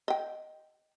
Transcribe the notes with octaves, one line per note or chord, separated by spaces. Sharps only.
D#5 G5